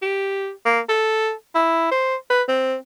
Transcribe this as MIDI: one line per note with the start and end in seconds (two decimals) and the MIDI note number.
0.02 0.50 67
0.65 0.80 58
0.89 1.32 69
1.55 1.89 64
1.91 2.15 72
2.30 2.42 71
2.48 2.75 60